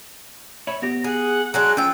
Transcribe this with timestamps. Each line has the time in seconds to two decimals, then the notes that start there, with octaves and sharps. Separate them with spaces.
0.67 C#5 E5 B5
0.82 B3 G4 A#6
1.04 G#4 F#5
1.54 F#3 G#3 D4 F#6
1.77 F3 C#4 G5 E6